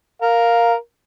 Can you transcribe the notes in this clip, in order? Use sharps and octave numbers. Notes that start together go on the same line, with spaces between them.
A#4 F5